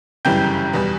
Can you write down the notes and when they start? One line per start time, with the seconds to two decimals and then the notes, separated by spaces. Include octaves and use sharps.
0.25 G1 F#2 C#3 E3 G3 G5 G6
0.73 E2 B2 G3 B3